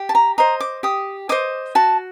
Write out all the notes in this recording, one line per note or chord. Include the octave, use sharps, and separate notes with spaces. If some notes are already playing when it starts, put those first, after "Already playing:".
Already playing: G4
A5
A#5
C5 D#5 A#5
D6
G4 D#6
C5 D#5 D6
F#4 A5